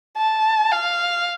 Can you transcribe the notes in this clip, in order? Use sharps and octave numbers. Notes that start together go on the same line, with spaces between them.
A5
F5